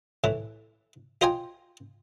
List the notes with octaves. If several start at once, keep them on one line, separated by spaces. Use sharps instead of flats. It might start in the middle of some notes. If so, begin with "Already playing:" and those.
A2 E3
F4 C5 D#5 G5 G#5